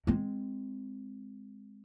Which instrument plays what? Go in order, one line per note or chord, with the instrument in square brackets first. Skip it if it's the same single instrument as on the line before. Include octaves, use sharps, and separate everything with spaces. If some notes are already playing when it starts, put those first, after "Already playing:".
[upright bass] G#3 C4